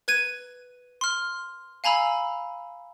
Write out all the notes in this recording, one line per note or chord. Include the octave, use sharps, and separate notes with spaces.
B4 G#6 D#7
C6 F6
F5 G#5 A#5 B5 E6